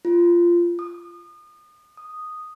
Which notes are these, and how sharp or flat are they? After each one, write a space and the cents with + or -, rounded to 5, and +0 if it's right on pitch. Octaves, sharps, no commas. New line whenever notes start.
F4 -15
D#6 -35
D#6 -5